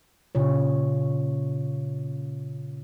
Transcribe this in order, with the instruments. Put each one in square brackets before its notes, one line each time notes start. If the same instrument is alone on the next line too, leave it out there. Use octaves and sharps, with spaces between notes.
[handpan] A#2 C#3 F4 C#5